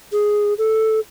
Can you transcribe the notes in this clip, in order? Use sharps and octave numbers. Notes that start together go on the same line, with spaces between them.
G#4
A4